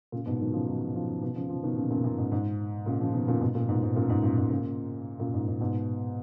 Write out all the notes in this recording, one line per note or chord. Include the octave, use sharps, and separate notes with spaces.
A#2 C#3
G#2 B2
D#3 F#3
C#3 F3
D#3 F#3
C#3 F3
B2 D#3
C#3 F3
C#3 F3
B2 D#3
A#2 C#3
F#2 A#2
F#2 A#2
G#2
G#2
A#2 C#3
C#3 F3
B2 D#3
A#2 C#3
G#2 B2
F#2 A#2
G#2 B2
G#2
F#2 A#2
G#2
F#2 A#2
G#2
A#2 C#3
F#2 A#2
G#2
G#2
G#2 B2